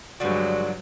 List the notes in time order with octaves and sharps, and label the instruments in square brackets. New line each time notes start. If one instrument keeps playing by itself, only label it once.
[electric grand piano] G2 D5 [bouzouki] D3 F3 [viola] F#3 [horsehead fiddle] G#3 F#4